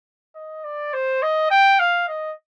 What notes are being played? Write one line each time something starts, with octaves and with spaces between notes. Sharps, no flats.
D#5
D5
C5
D#5
G5
F5
D#5